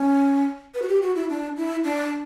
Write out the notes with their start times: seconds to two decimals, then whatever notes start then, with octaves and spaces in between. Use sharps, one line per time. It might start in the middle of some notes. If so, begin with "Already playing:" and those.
Already playing: C#4
0.75 B4
0.82 F#4
0.88 G4
1.02 F#4
1.15 E4
1.29 D4
1.57 E4
1.84 D4